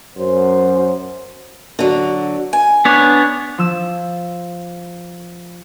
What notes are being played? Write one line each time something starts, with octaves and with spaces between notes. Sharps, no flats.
F#2 C5
D3 F#3
G#5
B3 D4 C#5
F3 E6